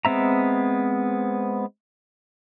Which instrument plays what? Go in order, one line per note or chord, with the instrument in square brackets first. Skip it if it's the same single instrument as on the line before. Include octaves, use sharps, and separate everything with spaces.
[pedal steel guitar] G#3 B3 C4 E5 A#5